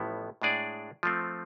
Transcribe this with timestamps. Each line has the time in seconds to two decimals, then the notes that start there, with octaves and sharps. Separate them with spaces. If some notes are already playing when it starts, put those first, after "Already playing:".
Already playing: A1 A2 F3 B3 E4
0.42 A2 G#3 D4 G#4 D5
1.03 F3 A3 C4